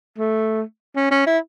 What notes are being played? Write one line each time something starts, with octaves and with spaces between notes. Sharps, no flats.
A3
C#4
C#4
E4